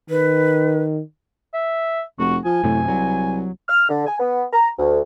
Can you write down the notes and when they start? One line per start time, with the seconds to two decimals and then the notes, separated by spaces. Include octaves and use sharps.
0.10 D#3 B4
1.54 E5
2.19 F1 F#4
2.45 F3 G#5
2.64 F#2 A2 C3 A3
2.88 C2 F#3
3.68 F6
3.89 D3
4.07 G#5
4.20 B3
4.53 A#5
4.79 D2